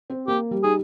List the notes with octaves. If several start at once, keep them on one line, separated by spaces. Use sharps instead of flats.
C4 C5
A#3 G4 A#4
G3 G4
D#4 G#4